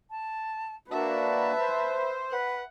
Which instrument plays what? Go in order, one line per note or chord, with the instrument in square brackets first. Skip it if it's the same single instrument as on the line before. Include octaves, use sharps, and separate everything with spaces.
[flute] A5
[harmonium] A#3 D4 F#4 [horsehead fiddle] B4 [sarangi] E5 [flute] A5
[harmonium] C5
[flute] B4 [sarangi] F#5